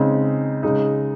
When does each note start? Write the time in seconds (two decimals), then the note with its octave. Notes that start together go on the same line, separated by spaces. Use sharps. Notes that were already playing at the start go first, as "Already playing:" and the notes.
Already playing: C#3 G#3 C4 D#4
0.63 C#3 G#3 D#4